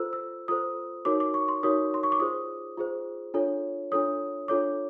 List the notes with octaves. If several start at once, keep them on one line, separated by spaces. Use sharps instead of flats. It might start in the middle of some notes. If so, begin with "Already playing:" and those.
Already playing: F4 A4 C5 E6
E6
F4 A4 C5 D#6
D#4 F#4 A#4 C#5 D6
D6
C#6
C6
D#4 F#4 A#4 C#5 D#6
C6
C#6
D6
F4 G#4 C5 D#6
F4 G#4 C5
D4 F4 A4 C#5
D4 F4 A4 C#5 D#6
D4 F4 A4 C#5 D6